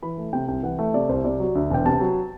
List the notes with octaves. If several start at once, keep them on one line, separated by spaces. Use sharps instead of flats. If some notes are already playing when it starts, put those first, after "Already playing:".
E3 B5
A3
C3 G5
C2 G5
E3 F#5
A3 E5
C3 D5
C2 C5
C3 D5
F#3
D2
E1 G5
C3 A5
F#3